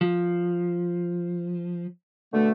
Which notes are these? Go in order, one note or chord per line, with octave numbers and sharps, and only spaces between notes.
F3
B2 D3 A3